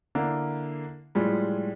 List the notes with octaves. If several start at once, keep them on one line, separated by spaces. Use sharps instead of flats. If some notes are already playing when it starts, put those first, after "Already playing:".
D3 A#3 E4
A2 F3 G3 G#3